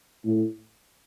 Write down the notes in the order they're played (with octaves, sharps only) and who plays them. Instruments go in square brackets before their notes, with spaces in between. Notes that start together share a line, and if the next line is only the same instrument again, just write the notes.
[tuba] A2